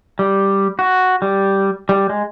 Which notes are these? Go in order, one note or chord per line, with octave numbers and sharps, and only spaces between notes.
G3
F#4
G3
G3
G#3